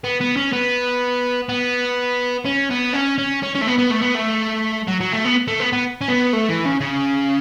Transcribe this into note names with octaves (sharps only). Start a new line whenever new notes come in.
B3
B3
C#4
B3
B3
C#4
B3
C#4
C#4
C#4
C#4
A3
B3
B3
A3
B3
A3
F#3
F#3
A3
B3
A3
B3
B3
C#4
B3
A3
E3
C#3
C#3